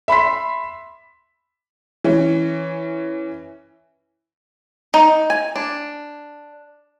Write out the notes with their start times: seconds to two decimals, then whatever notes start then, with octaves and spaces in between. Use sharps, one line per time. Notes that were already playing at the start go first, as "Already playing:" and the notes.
0.08 E5 B5 C6 B6
2.04 E3 C#4
4.94 D#4
5.30 G#5
5.56 D4